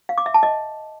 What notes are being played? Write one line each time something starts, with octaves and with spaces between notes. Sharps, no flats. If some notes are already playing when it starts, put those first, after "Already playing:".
F5
D6
E5
A5
D#5